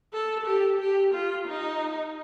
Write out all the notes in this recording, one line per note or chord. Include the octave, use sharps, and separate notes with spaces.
A4
G4
G4
F4
D#4